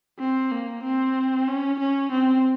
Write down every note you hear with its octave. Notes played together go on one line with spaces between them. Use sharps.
C4
A#3
C4
C#4
C#4
C4